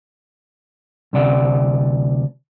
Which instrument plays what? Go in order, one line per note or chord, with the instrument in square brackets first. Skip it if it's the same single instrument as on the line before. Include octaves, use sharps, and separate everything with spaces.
[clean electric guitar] D2 C3 D5 F#5